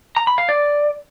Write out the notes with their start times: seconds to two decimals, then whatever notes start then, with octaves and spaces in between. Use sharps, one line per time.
0.17 A#5
0.27 B5
0.38 F5
0.49 D5